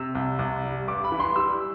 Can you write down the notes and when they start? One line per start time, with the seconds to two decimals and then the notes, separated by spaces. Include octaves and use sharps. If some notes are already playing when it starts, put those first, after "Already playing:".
Already playing: C3 E6
0.15 C2
0.39 C2
0.64 G3
0.88 G2 D6
1.04 B5
1.12 E3
1.20 C6
1.36 G3 E6